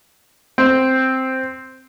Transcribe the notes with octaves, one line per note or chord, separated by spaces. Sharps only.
C4